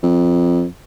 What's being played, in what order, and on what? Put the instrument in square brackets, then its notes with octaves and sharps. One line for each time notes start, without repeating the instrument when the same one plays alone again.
[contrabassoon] F2